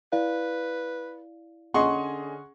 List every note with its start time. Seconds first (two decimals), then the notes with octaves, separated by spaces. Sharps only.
0.13 E4 B4 D5 F5
1.74 D3 C#4 G#4 D#5 F#5 C6 C#6